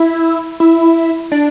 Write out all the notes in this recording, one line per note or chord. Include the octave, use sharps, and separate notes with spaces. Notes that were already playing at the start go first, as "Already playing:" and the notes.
Already playing: E4
E4
D4